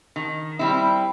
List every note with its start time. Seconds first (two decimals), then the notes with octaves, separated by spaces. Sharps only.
0.16 D#3
0.59 G3 C4 E4